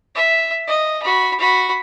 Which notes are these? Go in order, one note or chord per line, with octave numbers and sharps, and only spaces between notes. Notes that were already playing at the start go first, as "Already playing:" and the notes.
E5
D#5
F#4 B5
F#4 B5